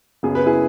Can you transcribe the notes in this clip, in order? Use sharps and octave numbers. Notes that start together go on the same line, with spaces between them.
F#1 F#2 F#3 B3 G#4
B4
E4 G#4